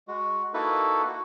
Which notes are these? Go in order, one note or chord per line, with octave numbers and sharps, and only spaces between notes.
G#3 F#4
A#3 D#4 E4 F#4 A4 B4
F#4